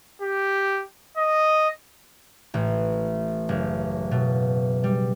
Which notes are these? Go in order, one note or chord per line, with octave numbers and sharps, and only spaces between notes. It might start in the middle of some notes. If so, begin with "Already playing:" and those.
G4
D#5
A1
F#1
B2
G3